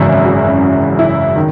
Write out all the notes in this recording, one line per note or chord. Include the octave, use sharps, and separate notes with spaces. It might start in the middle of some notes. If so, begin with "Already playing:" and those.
Already playing: G#1 F#2 C#3 E3 E4
F#4
E4
D#3